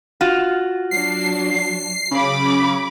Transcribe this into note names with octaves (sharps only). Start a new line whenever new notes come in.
F4 F#4
F#3 D4 C7
C#3 F#3 B5 D6